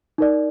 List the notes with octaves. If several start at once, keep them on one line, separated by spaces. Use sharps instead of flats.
D#4 A#4 D5